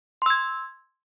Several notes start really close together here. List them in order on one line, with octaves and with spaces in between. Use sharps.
C6 E6 G#6